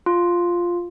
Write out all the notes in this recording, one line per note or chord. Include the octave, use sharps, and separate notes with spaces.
F4